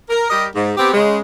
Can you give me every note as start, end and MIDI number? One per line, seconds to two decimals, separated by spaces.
0.10 0.30 70
0.30 0.47 55
0.30 0.47 67
0.30 0.47 70
0.30 0.47 75
0.55 0.71 44
0.77 0.90 59
0.77 0.90 60
0.77 0.90 67
0.94 1.20 49
0.94 1.20 56